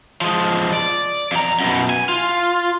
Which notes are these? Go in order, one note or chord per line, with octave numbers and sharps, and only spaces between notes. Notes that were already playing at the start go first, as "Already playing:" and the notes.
F3 G#3
D5
F2 A#5
F#2 B2
G#5
F4